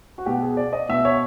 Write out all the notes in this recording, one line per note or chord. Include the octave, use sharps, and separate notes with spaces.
F#4
B2 G4
G#4
D5
D#5
B2 E5
C#5